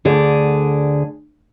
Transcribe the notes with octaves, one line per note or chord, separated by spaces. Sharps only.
D2 D3 G#4 D5